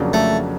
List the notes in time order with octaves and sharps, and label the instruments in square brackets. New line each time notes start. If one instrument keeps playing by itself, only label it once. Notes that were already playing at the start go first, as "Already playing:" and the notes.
Already playing: [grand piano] F2 C#3 F#3 A#3 D4
[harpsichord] A3